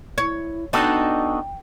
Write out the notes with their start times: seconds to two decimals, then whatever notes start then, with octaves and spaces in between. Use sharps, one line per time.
0.18 E4 C#5
0.73 B3 D4 D#4 F#4 A4 G5